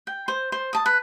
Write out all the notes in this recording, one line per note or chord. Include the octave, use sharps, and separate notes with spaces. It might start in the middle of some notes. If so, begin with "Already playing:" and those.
G5
C5
C5
A5 D#6
B4